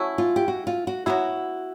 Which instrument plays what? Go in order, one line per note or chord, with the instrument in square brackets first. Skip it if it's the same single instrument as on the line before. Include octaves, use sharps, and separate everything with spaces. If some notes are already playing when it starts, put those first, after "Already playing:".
Already playing: [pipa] F#3 A3 C#4 E4
[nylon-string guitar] F4
G4
F#4
F4
F#4
[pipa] F#3 B3 E4 [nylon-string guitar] F#4